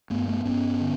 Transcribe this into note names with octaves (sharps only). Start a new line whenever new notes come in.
G2 A3 B3
A3 B3
G2 B3 C#4
D3